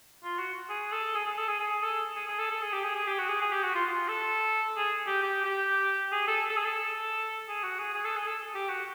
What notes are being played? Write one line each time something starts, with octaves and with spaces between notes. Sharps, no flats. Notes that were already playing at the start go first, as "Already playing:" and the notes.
F4
F#4
G#4
A4
G#4
G#4
A4
G#4
G#4
A4
G#4
G#4
A4
A4
G#4
G4
G#4
G#4
G4
F#4
G#4
G#4
G4
F#4
F4
F4
A4
G#4
G4
G4
G4
G#4
A4
A4
G#4
A4
G#4
F#4
G#4
G#4
A4
G#4
A4
G4
F#4